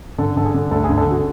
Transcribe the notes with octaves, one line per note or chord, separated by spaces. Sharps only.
D3 A4
D3 A4
G#4
D3
D2 A4
G#4
D3
A4
D3 F#4